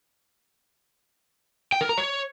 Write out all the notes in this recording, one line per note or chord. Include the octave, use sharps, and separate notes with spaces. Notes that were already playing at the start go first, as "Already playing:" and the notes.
G5
A#4
A#5
C#5